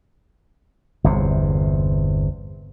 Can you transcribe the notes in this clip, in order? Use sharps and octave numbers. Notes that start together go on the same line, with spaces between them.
G1 E2 C3